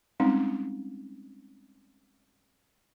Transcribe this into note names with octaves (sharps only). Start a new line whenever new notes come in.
G3 G#3 C4 C#4 D#4